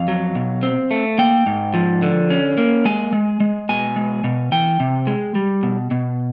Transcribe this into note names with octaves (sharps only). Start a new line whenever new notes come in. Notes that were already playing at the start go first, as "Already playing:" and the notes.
Already playing: F2 F5
F#3
B2
C4
A3
A#3 G5
G#2
F3
D3
C#4
A#3
G#3 G#5
G#3
G#3
B2 G#5
G#3
B2
E3 G5
C3
G#3
G3
B2
B2